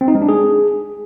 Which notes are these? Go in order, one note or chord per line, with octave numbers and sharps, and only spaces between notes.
C4
D#4
G#3
D4
G#4